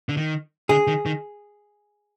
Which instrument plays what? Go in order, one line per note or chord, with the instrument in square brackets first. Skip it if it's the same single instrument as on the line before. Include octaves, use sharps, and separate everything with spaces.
[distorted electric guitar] D3
D#3
[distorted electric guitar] D3 [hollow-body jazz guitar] G#4
[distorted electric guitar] D#3
D#3